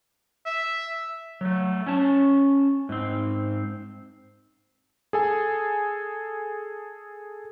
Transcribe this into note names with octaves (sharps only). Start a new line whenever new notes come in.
E5
F#3 A3
C#4 C#5 A5
G#2 C4
G#4 A4 G#5